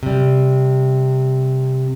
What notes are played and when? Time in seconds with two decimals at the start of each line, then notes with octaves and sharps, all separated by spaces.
0.03 C3 G3